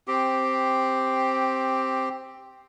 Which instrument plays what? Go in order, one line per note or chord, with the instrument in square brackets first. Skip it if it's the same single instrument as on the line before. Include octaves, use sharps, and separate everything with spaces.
[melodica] C4 G4